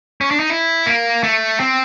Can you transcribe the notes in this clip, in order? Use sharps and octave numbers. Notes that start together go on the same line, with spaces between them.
C#4
D4
D#4
E4
A#3
A3
C4